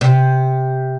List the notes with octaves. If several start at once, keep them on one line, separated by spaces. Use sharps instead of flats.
C3